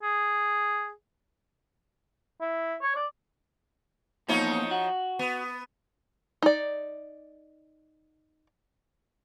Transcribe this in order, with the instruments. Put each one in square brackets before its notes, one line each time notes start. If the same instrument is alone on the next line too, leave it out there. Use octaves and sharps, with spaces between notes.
[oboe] G#4
[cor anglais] E4
C#5
D5
[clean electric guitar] E2 A#2 [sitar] F3 D#4 C#5
[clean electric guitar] F#4
[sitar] B3
[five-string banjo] D#4 D5